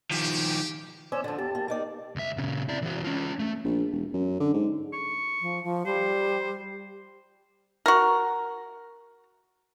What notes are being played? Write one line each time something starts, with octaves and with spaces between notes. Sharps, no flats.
D#3 F3 G4
C#4 C5 D5 E6
D3 F3 A5
E2 G4 A5
A#3
A#3 D#4 D5
C#2 E5
A#2 C#3
E4 D5
E3 F#4
C#4 F4
A3
A#1
E1
F#2
D3
G#2
C#6
F3
F3
G3 C5
F#4 A#4